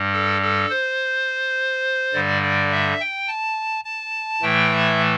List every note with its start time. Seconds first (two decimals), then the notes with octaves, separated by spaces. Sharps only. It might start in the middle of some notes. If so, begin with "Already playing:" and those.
Already playing: G2 G3
0.13 A4
0.42 A4
0.70 C5
2.13 G2 D3 G3 D5
2.42 D5
2.71 E5
3.00 G5
3.28 A5
3.85 A5
4.42 A2 E3 A3 G5
4.72 E5